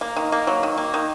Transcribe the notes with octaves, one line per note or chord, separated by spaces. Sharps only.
A#3
D#3
A#3
F#3
D#3
A#3
D#3